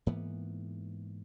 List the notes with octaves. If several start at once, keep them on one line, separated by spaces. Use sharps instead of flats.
G#2 E3 A#3 B3